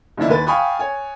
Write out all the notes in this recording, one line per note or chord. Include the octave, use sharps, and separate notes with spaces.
F#1 D#3 A#3 D4 E4
D#2 B4 A6
F5 G5 G#5 B5 C#6 D#6
C#5 G#5